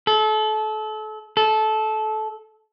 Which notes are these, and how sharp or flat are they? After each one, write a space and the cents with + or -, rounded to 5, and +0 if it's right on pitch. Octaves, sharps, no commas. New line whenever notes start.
A4 -30
A4 -20